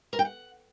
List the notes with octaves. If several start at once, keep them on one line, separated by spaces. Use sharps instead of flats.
A#4
G5
F#5